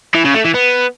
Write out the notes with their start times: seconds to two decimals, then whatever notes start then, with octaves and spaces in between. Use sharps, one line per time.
0.15 E3
0.25 C#3
0.35 A3
0.45 E3
0.54 B3